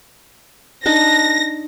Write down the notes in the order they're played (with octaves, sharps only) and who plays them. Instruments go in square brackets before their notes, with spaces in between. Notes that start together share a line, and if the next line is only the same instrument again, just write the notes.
[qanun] D4 D#4 A5 [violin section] A#6